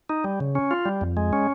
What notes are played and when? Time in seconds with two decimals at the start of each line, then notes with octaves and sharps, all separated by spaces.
0.09 D#4
0.24 G3
0.40 C#3
0.55 C#4
0.71 F4
0.85 G3
1.01 F2
1.17 G#3
1.33 C#4